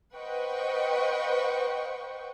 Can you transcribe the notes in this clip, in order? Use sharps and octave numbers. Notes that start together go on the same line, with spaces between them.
B4 C5 D#5 F#5 G5 C#6